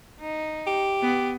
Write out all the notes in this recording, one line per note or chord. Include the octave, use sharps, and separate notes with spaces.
D#4
G4
B3